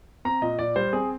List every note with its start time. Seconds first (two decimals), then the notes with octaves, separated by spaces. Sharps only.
0.25 C4 A#5
0.42 A#2 D#5
0.59 A#2 D5
0.76 G3 C5
0.93 C4 G#4